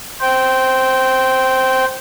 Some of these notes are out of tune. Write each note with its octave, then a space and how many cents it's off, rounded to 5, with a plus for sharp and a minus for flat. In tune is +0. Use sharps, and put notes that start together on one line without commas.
C5 +0 G5 -15